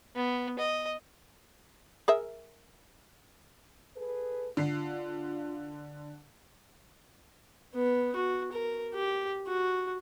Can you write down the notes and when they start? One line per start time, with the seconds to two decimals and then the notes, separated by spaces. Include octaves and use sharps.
0.15 B3
0.59 D#5
2.08 G#4 A#4 E5
3.96 G#4 A4 B4
4.57 D3 F4 C7
7.75 B3
8.16 F#4
8.52 A#4
8.93 G4
9.48 F#4